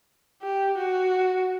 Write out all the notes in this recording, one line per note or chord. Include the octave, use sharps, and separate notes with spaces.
G4
F#4